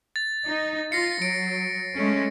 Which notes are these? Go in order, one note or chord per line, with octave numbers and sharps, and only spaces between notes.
A6
D#4
F4 A#6 C7 C#7
F#3 D7
G#3 A3 C#4